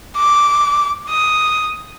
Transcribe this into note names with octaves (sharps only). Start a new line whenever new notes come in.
D6
D#6